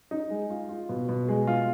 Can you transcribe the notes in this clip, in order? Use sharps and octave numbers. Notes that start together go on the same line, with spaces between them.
D#4
G#3
F4
F4
B2
B2
G#3
F4